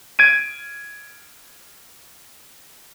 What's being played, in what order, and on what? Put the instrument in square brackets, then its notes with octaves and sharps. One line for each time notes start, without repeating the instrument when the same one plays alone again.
[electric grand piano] G#6 D7 D#7